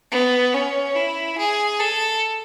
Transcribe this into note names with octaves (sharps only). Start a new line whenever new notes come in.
B3
C#4
E4
G#4
A4